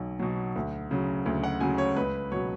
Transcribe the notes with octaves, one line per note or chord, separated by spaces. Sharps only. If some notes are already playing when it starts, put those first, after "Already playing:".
Already playing: B1 B2 F#3
B2 F#3
D2
C#3 F#3
D2
F#5
C#3 F#3 G#5
C#5
C#2 B4
B2 F#3 C#5